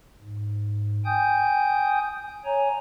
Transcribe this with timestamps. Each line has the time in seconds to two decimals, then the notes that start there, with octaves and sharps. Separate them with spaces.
0.20 G#2
1.05 G5 G#5 D#6 G6
2.45 C#5 G#5 A#5